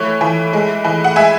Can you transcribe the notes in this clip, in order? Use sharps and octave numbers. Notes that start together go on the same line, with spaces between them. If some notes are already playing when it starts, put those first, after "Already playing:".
Already playing: E3 A3 C#5
E3
G#3
E3
F#5
G#3 E5 G#5